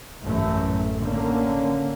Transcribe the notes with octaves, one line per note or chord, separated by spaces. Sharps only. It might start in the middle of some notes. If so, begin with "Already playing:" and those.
A1 F#2 A3
D3 A#3 C#4